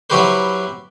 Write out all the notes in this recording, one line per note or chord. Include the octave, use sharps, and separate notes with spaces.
F#3 E4 F#4 G4 B4 C5